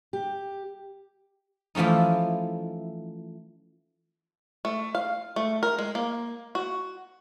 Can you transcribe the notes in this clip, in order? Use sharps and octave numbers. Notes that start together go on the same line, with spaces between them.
G4
E3 F3 A3 C#4 D#4
A3
F5
A3
A#4
G#3
A#3
F#4